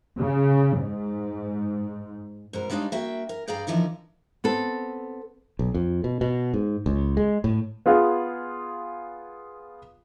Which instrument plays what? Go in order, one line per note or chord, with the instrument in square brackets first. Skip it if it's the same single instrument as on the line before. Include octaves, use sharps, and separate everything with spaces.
[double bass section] C#3
G#2
[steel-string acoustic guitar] G#2 B2 A#4
G3 G#3 D4 D#4 C#5 F5
A#3 F#4 E5 G5
A#4
G2 G#4 D5 F5 G5 A#5
D3 E3 F3 D#4 A#4
[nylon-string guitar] B3 C4 A4
[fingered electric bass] B1
F2
B2
B2
G#2
C#2
G#3
A2
[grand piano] B3 F4 G#4 F5